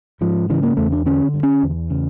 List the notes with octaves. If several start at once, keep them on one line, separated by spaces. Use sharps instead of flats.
G#2 F3
C#3 E3
A#3
E2 A3
D4
D3 C#4
G2
C#4
E2
C#3